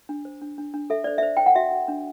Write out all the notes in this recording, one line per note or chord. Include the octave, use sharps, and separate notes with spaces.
D4
C5
D4
D4
D4
A4 E5
C5 D5
C5 E5
C5 G5
F#5
F#4 E5
F#4
D4